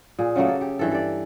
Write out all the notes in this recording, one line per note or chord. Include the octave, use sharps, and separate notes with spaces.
A#2 G#4
C#3 F#3 A3 A#3
A4
G4
G2 E3 A4
A4 D5